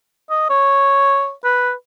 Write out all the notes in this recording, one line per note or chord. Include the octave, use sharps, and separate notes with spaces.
D#5
C#5
B4